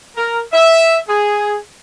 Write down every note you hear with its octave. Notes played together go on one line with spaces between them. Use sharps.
A#4
E5
G#4